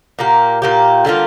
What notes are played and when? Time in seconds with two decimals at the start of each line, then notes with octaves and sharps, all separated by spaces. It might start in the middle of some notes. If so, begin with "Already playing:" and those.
0.19 A#2 A#3 G4
0.62 A#2 A#3 G4
1.05 D3 G3 A#3 F4